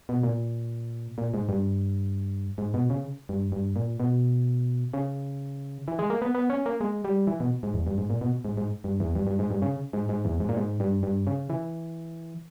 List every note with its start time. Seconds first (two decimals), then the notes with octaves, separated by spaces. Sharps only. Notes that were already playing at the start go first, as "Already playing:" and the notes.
0.09 B2
0.23 A#2
1.18 A#2
1.34 G#2
1.49 G2
2.58 G#2
2.74 B2
2.90 C#3
3.29 G2
3.52 G2
3.76 A#2
4.00 B2
4.93 C#3
5.88 E3
5.99 G#3
6.10 A#3
6.22 B3
6.35 B3
6.50 C#4
6.66 A#3
6.81 G#3
7.05 G3
7.27 E3
7.40 B2
7.63 G#2
7.74 E2
7.87 G2
7.98 G#2
8.10 A#2
8.21 B2
8.45 G#2
8.57 G#2
8.84 G2
9.00 E2
9.15 G2
9.27 G2
9.39 G#2
9.51 G2
9.62 C#3
9.93 G#2
10.09 G#2
10.25 E2
10.40 G#2
10.49 A#2
10.57 G#2
10.80 G2
11.03 G2
11.27 C#3
11.50 E3